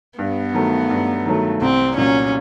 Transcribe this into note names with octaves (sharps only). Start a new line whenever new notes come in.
G2 B3
D#3 F#3 A3
G2
D#3 F#3 A3
C2 C4
A#2 F#3 C#4